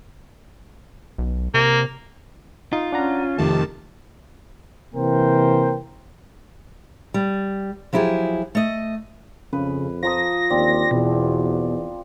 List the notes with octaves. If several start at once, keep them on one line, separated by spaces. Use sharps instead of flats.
B1
C3 A#3
D#4 F4
C#4 D4 F#5 A#5
F2 C3 D#3 A3 A5
C3 E3 A#3 A#4 C5 G5
G3
F3 F#3 E4 G4 G#4
A3 D#5
F2 C#3 B4
F3 A#5 D#6 A#6
D#2 C4 D4
E2 B2